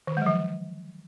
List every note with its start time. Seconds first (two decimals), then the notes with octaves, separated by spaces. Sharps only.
0.07 D#3
0.12 D3
0.17 G#3
0.22 F#3
0.26 F3